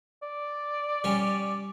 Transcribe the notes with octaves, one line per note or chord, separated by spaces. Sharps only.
D5
G3 C#4